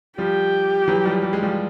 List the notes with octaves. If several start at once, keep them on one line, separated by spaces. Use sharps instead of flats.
F3 G3 G4
E3 F#3
F3 G3
G3
G#3
F3 G3